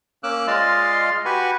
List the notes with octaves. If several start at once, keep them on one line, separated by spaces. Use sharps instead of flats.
A#3 C#4 D6 E6 F#6
G#3 F4 D5 D#5 F5 C6
F#4 G4 B4 G#5 B5 C#6